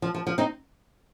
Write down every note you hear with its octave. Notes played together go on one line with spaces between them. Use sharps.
F3
F3
F3
C4 D#4